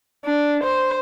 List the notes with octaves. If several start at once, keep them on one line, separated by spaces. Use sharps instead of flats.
D4
C5